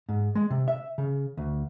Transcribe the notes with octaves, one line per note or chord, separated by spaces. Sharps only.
G#2
G#3
C3
E5
C#3
D2